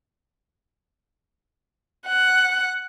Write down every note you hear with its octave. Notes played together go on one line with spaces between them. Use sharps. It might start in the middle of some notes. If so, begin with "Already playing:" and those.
F#5